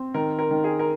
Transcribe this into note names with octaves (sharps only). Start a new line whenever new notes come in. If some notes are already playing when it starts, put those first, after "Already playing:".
Already playing: C4
D#3 A#4
A#4
D#3
G#4
A#4